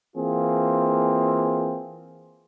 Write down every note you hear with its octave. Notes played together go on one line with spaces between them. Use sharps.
E3 A#3 C4 F4 G#4